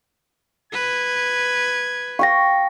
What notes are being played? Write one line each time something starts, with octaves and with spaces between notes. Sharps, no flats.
B4 G#6
F5 G5 C#6 A#6